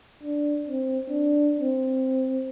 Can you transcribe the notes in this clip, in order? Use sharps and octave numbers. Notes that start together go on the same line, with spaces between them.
D4
C4
D4
C4